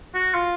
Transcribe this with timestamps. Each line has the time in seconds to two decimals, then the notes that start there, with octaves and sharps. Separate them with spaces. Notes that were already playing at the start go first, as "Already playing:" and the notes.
0.14 F#4
0.34 F4